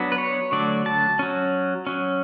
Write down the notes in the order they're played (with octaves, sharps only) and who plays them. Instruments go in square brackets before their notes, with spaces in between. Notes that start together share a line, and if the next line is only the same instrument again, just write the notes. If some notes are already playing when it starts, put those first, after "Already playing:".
Already playing: [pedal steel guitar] F#3 B3 D4
B4
C#5
D3 F#3 A3 D5
A5
F#3 C#4
F#3 C#4